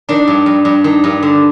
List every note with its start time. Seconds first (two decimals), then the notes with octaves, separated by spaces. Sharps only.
0.09 D#3 D4
0.27 G2
0.46 G2
0.65 G2
0.84 D#3
1.04 G2
1.22 D3